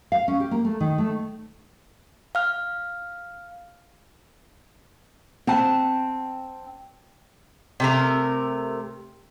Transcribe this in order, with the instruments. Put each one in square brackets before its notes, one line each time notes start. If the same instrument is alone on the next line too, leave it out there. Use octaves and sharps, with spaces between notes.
[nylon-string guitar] F5
C#4
G4
A#3
A3
D#3
A3
[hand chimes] F5 F6
[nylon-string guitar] C4 F#5 A5
[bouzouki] C3 A3 A#4